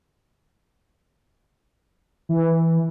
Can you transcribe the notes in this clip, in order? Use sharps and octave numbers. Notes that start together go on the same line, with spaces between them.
E3